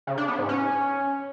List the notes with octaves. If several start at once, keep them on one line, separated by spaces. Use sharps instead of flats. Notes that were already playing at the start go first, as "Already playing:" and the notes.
C#3
D4
B3
G#2
C#4